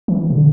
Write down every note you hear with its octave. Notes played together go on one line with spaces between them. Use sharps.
E3
B2
D3